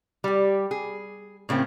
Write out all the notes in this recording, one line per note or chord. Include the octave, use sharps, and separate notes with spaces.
G3 G4
G#4
A2 C#3 A#3 C4